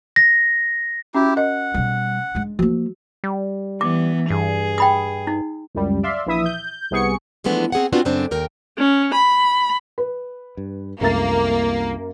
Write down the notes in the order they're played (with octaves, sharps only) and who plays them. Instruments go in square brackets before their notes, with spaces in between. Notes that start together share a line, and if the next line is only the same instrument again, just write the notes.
[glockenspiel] A#6
[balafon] C#4 F#4 [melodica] E4 G4
[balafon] A#4 D#5 [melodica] F#5
[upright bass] B2 G3
G#3 D4
[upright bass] F3 A#3 [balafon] F#4
[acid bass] G3
[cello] E3 B3 [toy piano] D6
[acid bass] G2 [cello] G#4
[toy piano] G5 B5 D#6
D#4
[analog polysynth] C#2 F#2 G3
D5 E5 F5 C6
A#1 E3 E4 E5 D#6
G6
C2 C3 B3 G#4 C#6 C#7
[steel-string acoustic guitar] E3 F3 G#3 A3 B3 D4
C4 G#4 C#5 F#5
B3 C4 D4 F4 F#4
F#2 C#3 A3 B3 C4 D4
D#2 A#4 G5
[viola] C#4
B5
[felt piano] B4
[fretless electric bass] G2
[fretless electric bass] C2 A3 [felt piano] F#2 A6 [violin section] A#3